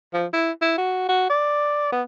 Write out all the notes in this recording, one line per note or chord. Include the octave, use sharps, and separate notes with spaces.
F3
E4
E4
F#4
F#4
D5
B3